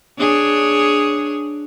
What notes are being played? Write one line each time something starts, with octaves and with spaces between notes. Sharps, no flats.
D4 G#4 C#5